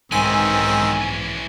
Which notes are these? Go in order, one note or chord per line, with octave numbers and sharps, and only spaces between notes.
B1 G#2 D#3 E3 C4 C#4 G#5 E6